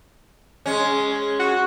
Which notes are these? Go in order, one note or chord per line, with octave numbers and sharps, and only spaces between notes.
G#3 C#4
F#4